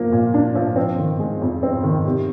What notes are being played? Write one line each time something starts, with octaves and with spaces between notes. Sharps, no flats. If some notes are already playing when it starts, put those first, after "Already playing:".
Already playing: F3 A#3
A#2
D4
F3
C4
D#3
G#3
F2
C4
D#3
C3